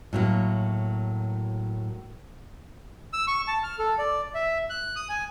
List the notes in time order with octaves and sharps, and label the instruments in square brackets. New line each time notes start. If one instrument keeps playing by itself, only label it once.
[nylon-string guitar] A2 F#3 A#3
[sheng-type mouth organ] E6
C#6
A5
F6
A4
D5
E5
F#6
D#6
G#5